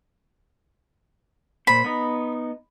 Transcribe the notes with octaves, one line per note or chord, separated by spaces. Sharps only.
A#2 C5 B5
B3 D#4